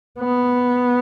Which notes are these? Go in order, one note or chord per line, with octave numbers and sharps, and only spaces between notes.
B3